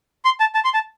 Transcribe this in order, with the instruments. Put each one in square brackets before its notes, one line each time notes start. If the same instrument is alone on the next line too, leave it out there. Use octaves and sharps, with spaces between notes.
[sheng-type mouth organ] C6
A5
A5
C6
A5